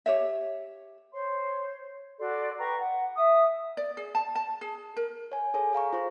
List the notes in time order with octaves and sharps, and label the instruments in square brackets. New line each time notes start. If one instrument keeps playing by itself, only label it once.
[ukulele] G4 C#5 E5
[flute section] C5 C#5 C6
F#4 A4 D5 C6
B4 G5 A#5 C#6
F#5
E5 D#6
[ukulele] D5
G#4
A5
A5
G#4
A#4
[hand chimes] C#5 G#5
G#4 A4 C#5 G#5
G#4 F5 A#5 C#6
F4 C5 C#6